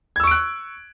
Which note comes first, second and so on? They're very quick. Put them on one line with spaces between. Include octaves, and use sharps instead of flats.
G#6 E6 C#6 D7 F#6